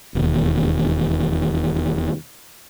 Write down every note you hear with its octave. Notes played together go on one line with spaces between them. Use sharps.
E1 D#2